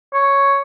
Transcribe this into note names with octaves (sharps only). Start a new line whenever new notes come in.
C#5